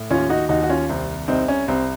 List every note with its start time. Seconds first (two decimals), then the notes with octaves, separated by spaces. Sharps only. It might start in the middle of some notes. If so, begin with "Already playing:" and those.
Already playing: A2
0.10 D#2 C#4 F4
0.29 D#4 F#4
0.49 D#2 D#4 F#4
0.63 F#4
0.70 C#4 F4
0.89 C2 C4
1.28 C2 C4 D#4
1.48 C#4
1.68 C2 C4